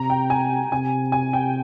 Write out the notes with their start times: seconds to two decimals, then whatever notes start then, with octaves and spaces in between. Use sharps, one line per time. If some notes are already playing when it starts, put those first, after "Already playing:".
Already playing: C3 A#5
0.10 G5
0.30 G#5
0.72 C3 G#5
1.12 G#5
1.33 G5